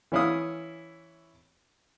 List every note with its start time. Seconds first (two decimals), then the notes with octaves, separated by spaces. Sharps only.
0.12 E3 C#4 E4 F5 D#6